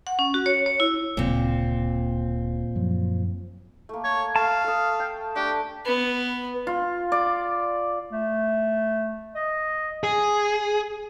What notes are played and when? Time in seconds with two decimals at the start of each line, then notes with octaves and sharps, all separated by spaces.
0.07 F#5
0.19 C#4
0.34 F#4
0.46 C#5
0.66 C#5
0.80 E4
1.17 D1 A#2 C#3 C4
2.75 F#2 F3 F#3
3.89 A3 A#3
4.04 C#5
4.36 A3 F5 A5
4.64 A4 D#6
5.00 G5
5.35 A3 D4 G4
5.86 B3
6.67 F4
7.12 D5
8.11 A3
9.35 D#5
10.04 G#4